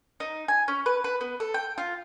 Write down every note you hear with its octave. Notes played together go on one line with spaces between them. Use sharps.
D#4
G#5
C#4
B4
B4
B3
A4
G5
F4